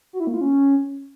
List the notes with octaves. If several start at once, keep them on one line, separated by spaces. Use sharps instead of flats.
F#4
E4
A#3
F4
C#4